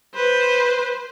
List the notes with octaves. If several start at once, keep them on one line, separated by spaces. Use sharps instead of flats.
B4 C5